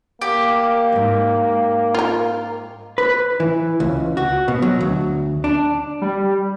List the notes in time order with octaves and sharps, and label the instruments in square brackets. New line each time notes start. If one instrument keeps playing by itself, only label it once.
[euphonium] A#3 [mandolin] G4
[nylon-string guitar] E2 G#2
[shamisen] F4 A#4
[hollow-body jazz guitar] B4
E3
C#2
F#4
B2
F#3
D2
D4
[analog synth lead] G3